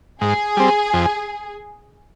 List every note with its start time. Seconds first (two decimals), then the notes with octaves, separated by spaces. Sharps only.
0.21 G#2 G#4
0.57 G3 C4
0.93 F2